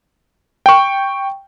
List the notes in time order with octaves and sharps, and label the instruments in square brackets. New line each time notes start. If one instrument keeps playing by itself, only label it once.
[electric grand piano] G5 C#6